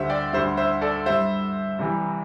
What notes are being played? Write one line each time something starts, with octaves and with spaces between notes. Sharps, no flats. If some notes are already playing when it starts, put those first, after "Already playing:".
Already playing: D2 D3 G3 C5 E5
D5 G5
D2 D3 G3 C5 E5
C5 E5
A4 D5
G2 G3 C5 E5
C2 C3 E3 G3